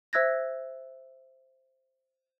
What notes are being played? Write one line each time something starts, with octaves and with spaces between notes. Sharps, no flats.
C5 E5 E6 F#6 G#6 A#6